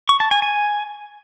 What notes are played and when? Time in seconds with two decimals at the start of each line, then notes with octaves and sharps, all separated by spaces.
0.09 C#6
0.20 A5
0.31 G#5
0.42 G#5